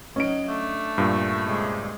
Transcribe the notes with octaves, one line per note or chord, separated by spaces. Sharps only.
F#3 C#4 D#4 D#5 D7
A3 D4
G2 A#2
C3 G#3 G#4